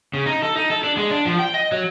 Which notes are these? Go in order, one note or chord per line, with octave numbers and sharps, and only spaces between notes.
C#3
D#4
A4
D#4
A4
D4
G#3
D4
F3
G5
D#5
F#3